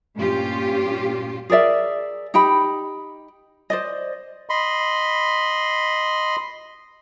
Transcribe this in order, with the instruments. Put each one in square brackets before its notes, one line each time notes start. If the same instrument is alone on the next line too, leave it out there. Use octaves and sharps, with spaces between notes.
[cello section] G2 A#2 C#4 F4 G4
[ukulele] G#4 A#4 D5 E5
D#4 G4 G5 B5
C5 D5 D#5
[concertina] D#5 B5 C6